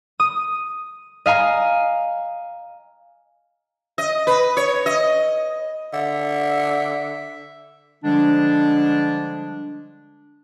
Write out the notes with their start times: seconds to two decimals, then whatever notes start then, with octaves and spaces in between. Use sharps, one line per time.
0.20 D#6
1.26 D#5 F5 G#5 A#5
3.98 D#5
4.27 B4
4.57 C#5
4.86 D#5
5.93 D3 E5
8.04 D3 F3 G3 G#3 D4